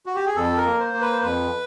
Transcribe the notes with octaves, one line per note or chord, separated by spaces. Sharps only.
F#4
G4
G#4
F2 A4
A#4
A#3
C5
A#3
B4
C5
F2 B4